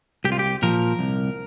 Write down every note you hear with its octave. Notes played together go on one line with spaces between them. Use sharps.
C2 G4
F4
G4
A#2 F3 A#4
C2